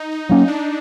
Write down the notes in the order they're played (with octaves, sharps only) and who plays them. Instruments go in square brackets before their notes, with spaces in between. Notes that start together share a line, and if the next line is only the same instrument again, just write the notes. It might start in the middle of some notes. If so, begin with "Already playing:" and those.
Already playing: [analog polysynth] D#4
D#4
[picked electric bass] F#3 A#3 C#4
[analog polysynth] D#4
D4